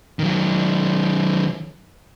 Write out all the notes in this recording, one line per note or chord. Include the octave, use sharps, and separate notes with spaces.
D#3 F#3